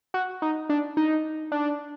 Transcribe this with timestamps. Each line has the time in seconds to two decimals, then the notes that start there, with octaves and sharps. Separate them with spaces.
0.14 F#4
0.42 D#4
0.70 D4
0.97 D#4
1.52 D4